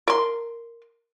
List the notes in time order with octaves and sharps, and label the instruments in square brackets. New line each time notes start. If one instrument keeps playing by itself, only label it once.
[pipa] A#4 C6